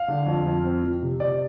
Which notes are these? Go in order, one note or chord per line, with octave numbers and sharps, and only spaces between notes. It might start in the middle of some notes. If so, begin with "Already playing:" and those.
Already playing: F5
D3
F2
F2
C4
F3
C3
C3 D5